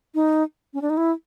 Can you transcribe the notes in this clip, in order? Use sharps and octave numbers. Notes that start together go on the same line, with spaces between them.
D#4
C#4
D4
D#4
E4